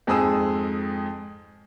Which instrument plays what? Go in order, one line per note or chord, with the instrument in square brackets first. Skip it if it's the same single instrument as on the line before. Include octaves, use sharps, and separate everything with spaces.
[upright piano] F2 G#2 G#4 D#6 E6